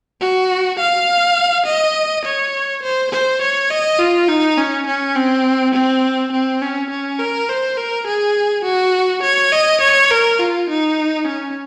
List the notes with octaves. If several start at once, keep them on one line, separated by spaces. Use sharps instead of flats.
F#4
F5
D#5
C#5
C5
C5
C#5
D#5
F4
D#4
C#4
C#4
C4
C4
C4
C#4
C#4
A#4
C5
A#4
G#4
F#4
C#5
D#5
C#5
A#4
F4
D#4
C#4